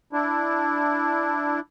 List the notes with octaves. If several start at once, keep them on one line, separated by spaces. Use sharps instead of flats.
D4 E4